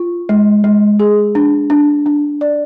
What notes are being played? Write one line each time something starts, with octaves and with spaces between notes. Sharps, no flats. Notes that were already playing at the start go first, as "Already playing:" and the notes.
Already playing: F4
G#3
G#3
G#4
D4
D4
D4
D5